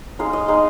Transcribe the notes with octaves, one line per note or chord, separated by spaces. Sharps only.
G#3 D#4 F5
D#5
G#3 D#4 F5